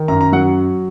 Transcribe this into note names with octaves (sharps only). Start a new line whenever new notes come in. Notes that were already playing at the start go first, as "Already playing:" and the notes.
Already playing: D#3
F#2 A#5
A#5
F#3 F#5